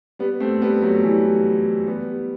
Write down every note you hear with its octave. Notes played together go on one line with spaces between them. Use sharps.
G3 B3
A3 C4
G3 B3
F#3 A3
E3 G3
G3 B3